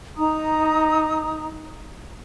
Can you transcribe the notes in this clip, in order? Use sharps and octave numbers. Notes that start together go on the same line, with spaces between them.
D#4 A#5 D#6